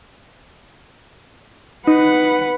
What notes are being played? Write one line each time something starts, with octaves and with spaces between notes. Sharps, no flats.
D#4 B4 F#5